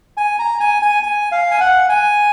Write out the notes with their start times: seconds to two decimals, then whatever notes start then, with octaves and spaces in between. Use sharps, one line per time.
0.17 G#5
0.39 A#5
0.60 G#5
0.82 G#5
1.03 G#5
1.32 F5
1.51 G#5
1.60 F#5
1.89 G#5